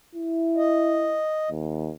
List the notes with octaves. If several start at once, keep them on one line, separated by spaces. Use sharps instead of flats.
E4
D#5
D#2